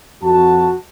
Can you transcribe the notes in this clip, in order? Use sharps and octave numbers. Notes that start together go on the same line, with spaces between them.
F2 F#4 A5